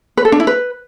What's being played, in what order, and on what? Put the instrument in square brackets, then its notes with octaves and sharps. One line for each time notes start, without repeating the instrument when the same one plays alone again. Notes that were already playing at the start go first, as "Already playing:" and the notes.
[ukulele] B4
A4
D4
E4
B4